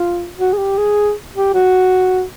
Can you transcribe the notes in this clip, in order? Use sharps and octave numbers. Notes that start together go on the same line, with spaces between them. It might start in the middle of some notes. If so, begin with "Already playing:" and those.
Already playing: F4
F#4
G#4
G4
G#4
G4
F#4